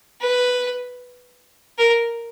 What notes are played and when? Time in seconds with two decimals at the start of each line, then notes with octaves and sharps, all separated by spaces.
0.21 B4
1.78 A#4